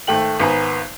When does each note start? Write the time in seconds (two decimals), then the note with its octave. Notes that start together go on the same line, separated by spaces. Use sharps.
0.07 G#1 A3 G5 F#7
0.40 G#1 B3 G#5 A#5